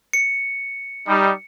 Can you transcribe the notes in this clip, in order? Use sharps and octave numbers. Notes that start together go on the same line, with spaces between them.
C#7
G3 D#4